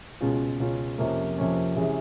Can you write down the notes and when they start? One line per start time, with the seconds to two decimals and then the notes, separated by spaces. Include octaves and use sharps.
0.21 C#2 B2 G#3 C#4 F4
0.60 C#2 B2 G#3 C#4 F4
0.98 F2 C3 F3 A#3 C#4
1.38 F2 C3 F3 A#3 C#4
1.76 C3 E3 G#3 C#4